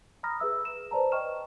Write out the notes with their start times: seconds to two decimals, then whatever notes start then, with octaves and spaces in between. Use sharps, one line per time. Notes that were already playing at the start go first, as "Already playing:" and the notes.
0.23 A#5 B5 D#6 F6 A#6
0.40 G#4 B4 E5 E6
0.65 E7
0.91 B4 C5 D5 A5 A#5
1.12 D#5 G5 C#6 F6 E7